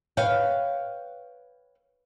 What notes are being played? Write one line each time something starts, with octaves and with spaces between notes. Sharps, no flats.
B4 C#5 F5 G5